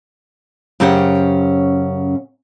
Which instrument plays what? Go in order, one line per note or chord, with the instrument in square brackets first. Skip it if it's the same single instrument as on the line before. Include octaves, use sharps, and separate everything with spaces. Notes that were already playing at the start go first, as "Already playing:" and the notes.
[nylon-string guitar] F#2 C#3 C#4 G4 C5 F#5